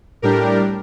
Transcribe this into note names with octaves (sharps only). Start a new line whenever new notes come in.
A2 G3 D4 G4 A#4